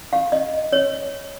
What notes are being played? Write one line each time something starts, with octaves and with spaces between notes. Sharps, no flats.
F5
D#5
C#5